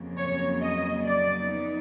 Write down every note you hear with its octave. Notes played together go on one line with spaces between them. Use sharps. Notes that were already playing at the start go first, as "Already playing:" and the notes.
Already playing: F2 C#3 F#3 A#3
C#5
D#5
D5
B3 D#4